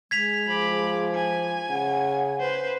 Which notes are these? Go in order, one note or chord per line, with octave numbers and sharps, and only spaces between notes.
G#3 G#6 B6 F7
F3 B5 D6
G#5
C#3 F#5
B4 C5